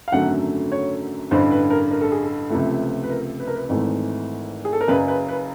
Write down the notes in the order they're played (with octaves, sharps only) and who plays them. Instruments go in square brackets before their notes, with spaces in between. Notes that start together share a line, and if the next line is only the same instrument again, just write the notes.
[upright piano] F5
G#1 F#2 D3 F#3 A3 F#5
C#5
A1 G2 D3 C5
B4
A#4
A#4
A4
G#4
A4
C#2 C3 F3 A3
B4
A#4
B4
A#4
B4
G#1 G#2 E3 A3
G#4
A4
A#4
F#1 F#2 C#3 B4
B4
B4